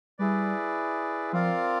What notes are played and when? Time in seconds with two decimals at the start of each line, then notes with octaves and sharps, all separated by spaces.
0.19 G3 E4 G#4 B4 D5
1.32 F3 C4 F4 A#4 D5 F5